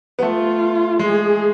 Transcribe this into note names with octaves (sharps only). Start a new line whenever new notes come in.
B3
A3 F4
G#3 G#4